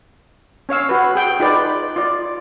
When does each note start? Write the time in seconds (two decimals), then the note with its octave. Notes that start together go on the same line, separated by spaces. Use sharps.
0.69 C#4 C#5 F5 E6
0.89 F#4 B4
1.15 G#4 G5
1.40 D#4 F4 G#4 B4 D5
1.96 F4 D5